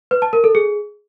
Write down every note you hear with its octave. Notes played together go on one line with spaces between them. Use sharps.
B4
A5
A#4
A4
G#4